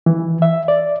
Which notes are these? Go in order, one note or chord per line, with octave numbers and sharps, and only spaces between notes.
E3
E5
D5